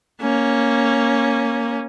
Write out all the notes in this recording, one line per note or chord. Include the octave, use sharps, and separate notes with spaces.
A#3 C#4